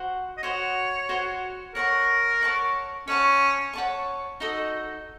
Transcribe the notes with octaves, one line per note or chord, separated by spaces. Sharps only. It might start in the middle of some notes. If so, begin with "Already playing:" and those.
Already playing: F#4 C5 F#5
D#5
F#4 C5 C#5 F#5
F#4 C5 F#5
A#4 C#5 F#5 A5 C#6
C#5 F#5 A5 C#6
C#4 C#5 F#5 A5 C#6
C#5 F#5 A5 C#6
D#4 F#4 A4 D#5